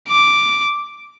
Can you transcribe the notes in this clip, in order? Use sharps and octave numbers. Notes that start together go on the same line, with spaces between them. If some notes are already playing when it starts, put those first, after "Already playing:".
D6